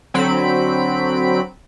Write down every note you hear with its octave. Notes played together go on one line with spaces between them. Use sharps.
D3 F#3 C4 B5 D7